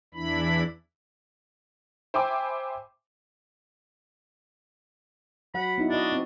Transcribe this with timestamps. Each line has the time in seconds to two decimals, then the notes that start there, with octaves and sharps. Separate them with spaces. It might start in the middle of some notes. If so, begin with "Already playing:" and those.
0.14 E2 E3 D4 E4 B5
2.14 C5 E5 G5 G#5 B5 D6
5.54 F#3 F#5 B5
5.78 B3 D#4 E4
5.90 D4 F#4 D#5
6.12 C4